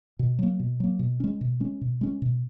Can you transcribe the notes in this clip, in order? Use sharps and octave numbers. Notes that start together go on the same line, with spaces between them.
B2
F#3 A#3
B2
F#3 A#3
B2
G#3 C#4
B2
G#3 C#4
B2
G#3 C#4
B2